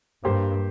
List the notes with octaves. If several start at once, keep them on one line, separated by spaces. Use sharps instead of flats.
G2 A#3 G4 C5